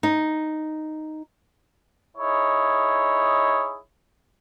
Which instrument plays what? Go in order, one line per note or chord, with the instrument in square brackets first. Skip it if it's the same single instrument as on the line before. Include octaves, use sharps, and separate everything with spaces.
[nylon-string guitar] D#4
[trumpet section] D#4 E4 G#4 C#5